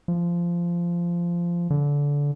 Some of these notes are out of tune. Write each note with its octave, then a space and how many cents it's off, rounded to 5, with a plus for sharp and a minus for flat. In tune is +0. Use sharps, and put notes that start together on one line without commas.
F3 -15
D3 -25